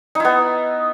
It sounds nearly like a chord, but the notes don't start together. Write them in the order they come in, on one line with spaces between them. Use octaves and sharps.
D#4 E4 B3